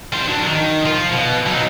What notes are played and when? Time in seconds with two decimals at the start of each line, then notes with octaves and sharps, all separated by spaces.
0.12 G3 C5
0.27 F#3 D4
0.47 D#3
0.86 F3 F4
1.12 B2
1.47 F#3 D#4